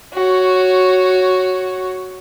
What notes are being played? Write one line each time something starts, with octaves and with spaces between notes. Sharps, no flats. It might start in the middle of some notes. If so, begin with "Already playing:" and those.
F#4 C#5